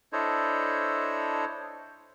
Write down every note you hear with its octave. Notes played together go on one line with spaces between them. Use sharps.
D4 E4 A4 C5 C#5 D#5